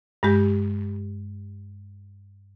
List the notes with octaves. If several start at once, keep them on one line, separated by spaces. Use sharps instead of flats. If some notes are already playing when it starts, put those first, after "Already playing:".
G2 G#3 G4